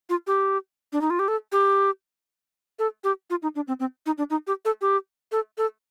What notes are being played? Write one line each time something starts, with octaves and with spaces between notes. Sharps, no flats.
F4
G4
D4
D#4
F4
G4
A4
G4
A4
G4
F4
D#4
D4
C4
C4
D#4
D4
D#4
G4
A4
G4
A4
A4